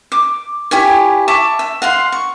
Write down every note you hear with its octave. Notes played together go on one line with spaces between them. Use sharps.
D6
E4 G4 C#5 G#5
E5 A5 C#6 D6
E5
F5 F#5 C6
C#6